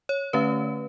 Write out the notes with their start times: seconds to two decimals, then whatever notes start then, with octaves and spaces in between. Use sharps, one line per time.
0.09 C#5
0.33 D3 A3 C#4 B4